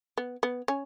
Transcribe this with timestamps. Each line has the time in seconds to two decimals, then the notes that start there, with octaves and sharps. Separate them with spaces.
0.18 B3
0.43 B3
0.68 C#4